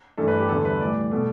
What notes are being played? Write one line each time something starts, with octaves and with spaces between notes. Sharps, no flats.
G2 E3 A3 A4
B4
G4
E2 D3 G3 A4
B4
A2 E3 G3 D5
B2 A3